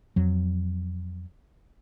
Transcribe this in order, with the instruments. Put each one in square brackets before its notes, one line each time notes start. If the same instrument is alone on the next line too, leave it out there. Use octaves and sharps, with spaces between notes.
[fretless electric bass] F2 F#3